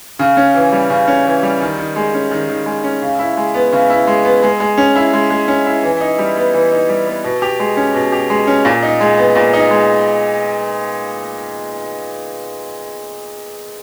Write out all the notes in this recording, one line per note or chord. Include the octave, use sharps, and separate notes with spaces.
C#3
C#4
E3
G3
C#3
C#4
E3
G3
D#3
D#3
G#3
C#4
D#3
D#3
G#3
C#4
C#3
E4
G#3
B3
C#3
E4
G#3
B3
G#3
G#3
C#4
E4
G#3
G#3
C#4
E4
E3
D#4
G3
B3
E3
D#4
G3
B3
B2
G4
G#3
C#4
B2
G4
G#3
C#4
A#2
D#4
G#3
B3
A#2
D#4
G#3